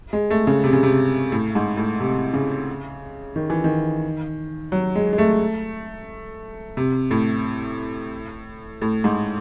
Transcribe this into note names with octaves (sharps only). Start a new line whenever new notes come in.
G#3
A3
C#3
C3
C#3
C3
A2
G#2
A2
C3
C#3
D#3
E3
D#3
F#3
G#3
G#3
A3
C3
A2
A2
G#2